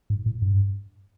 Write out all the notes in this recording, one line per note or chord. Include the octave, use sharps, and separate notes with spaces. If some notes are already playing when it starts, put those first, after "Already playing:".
G#2
A2
G2